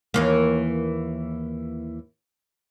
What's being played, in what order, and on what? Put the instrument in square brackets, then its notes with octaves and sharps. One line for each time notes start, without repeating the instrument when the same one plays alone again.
[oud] D#2 E3 A#3